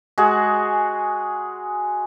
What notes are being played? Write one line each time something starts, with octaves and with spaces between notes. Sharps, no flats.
G#3 F#4 G#4